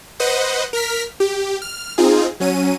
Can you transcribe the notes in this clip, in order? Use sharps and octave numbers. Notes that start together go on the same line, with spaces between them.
B4 C5 D#5 F#5
A#4 F6 B6
G4
F6
C4 D#4 F4 G#4
F#3 C#4 D#7